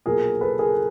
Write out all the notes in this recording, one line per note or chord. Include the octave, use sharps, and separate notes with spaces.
B1 A#2 F3 G#4 A#4
A4 B4
G#4 A#4